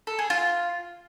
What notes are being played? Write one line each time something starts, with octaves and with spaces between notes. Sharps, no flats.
A4
G#4
F4